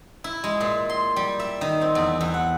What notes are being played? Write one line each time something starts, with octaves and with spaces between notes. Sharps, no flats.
E4
G#3
A#2
C6
G3
E5
D#3
C4
E2
E2
F#5